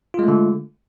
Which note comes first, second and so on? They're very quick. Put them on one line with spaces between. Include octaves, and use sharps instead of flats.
F4 G#3 A3 D3